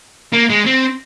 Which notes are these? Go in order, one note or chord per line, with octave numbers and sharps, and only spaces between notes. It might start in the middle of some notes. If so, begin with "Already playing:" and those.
A#3
G#3
C4